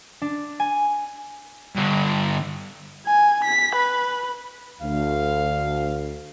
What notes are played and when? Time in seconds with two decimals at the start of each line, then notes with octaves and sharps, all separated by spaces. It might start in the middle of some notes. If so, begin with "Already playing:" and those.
0.22 D4
0.60 G#5
1.76 G2 D3
3.06 G#5
3.44 B6
3.75 B4
4.82 D2 F5